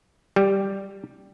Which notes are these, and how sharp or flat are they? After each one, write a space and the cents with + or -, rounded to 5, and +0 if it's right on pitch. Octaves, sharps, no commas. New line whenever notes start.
G3 +0 G4 +0